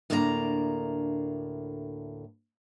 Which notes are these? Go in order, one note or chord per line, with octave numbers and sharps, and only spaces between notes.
D2 A2 A#3 D4 C#5 A#5